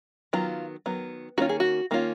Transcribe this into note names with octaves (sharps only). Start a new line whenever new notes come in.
D#3 F#3 B3 F4
D#3 F#3 B3
D#3 A#3 C#4 F4 F#4
G#4
F#4
D#3 A#3 C#4 F4